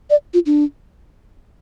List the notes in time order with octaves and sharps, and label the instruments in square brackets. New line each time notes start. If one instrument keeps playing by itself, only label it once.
[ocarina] D5
F4
D4